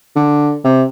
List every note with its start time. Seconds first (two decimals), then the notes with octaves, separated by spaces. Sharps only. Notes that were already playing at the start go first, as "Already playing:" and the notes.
0.16 D3
0.64 C3